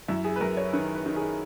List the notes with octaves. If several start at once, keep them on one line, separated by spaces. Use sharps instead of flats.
F#2 E4
G#4
B4
F#2 A#4
C#5
D#3 B4
B4
D#3
G#4